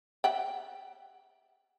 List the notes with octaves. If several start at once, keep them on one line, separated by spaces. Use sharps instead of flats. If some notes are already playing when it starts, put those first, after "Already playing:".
E5 F#5 G5